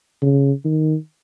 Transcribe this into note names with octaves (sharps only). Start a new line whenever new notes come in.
C#3
D#3